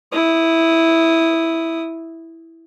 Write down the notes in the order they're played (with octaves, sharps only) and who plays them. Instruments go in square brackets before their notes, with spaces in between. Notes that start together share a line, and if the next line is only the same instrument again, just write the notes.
[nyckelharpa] E4 D#6